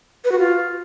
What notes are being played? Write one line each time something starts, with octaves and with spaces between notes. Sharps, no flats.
B4
F#4
F4